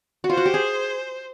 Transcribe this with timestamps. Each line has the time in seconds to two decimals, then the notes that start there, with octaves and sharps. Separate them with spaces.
0.24 F#4
0.29 F4 C5
0.37 F#4
0.45 G4
0.54 G#4